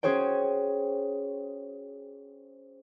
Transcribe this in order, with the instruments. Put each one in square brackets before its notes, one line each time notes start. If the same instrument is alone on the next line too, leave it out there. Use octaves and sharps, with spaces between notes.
[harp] C#4 F#4 G#4 C5 C#5 G5